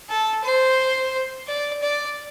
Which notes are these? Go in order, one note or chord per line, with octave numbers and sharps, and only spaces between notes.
A4
C5
D5
D5